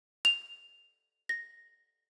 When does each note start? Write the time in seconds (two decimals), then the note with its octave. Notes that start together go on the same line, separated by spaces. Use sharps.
0.25 F7
1.29 A#6